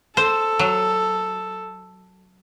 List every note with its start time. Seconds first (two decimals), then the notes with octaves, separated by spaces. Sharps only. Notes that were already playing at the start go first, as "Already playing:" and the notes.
0.17 A4 C5
0.59 F#3